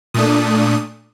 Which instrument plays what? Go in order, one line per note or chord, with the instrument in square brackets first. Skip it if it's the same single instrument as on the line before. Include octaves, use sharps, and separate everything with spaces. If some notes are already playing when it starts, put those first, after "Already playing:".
[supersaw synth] A#2 A3 D4 D#6